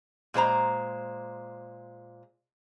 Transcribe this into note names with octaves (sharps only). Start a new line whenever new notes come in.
A#2 G#3 C5 A#5